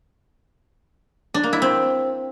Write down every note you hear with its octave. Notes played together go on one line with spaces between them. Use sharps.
D4
A#3
E4
C4